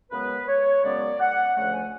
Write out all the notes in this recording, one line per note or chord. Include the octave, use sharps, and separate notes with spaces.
F#2 C#3 G#3 B3 B4
C#5
F#2 C#3 G#3 B3 D5
F#5
D2 C#3 F3 A3 F#5
G#5